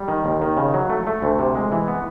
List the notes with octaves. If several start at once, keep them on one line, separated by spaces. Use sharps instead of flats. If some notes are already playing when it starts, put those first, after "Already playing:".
Already playing: G3
D#3
D#2
D#3
C#3
F#3
A3
A3
D2
C3
G#3
E3
B3